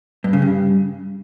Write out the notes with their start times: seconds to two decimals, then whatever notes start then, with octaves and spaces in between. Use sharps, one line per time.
0.24 G2
0.33 C#3
0.42 G2